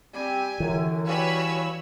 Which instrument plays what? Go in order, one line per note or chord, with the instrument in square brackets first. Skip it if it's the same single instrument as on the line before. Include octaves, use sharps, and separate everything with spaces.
[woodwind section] G3 C4 [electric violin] G4 G#5
[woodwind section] F#2 D3 [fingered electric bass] E3
[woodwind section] G3 F5 G#5 [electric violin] F#4 B4 [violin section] C#5 B5 E6